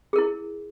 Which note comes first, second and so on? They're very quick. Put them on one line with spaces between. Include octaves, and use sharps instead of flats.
G#4 A#4 E4